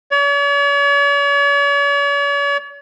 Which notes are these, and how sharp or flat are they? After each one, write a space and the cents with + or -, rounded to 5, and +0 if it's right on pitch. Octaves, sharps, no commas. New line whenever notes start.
C#5 +45